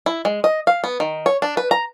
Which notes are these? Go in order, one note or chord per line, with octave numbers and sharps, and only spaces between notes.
E4
G#3
D#5
F5
B3
D#3
C#5
D4
B4
A#5